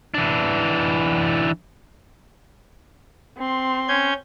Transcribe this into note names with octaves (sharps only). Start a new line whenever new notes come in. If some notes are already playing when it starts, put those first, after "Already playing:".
E3 D4
C4 C6
C#4 G6 G#6